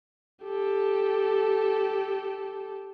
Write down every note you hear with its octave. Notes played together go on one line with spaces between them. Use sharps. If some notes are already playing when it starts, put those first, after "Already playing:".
G4 A4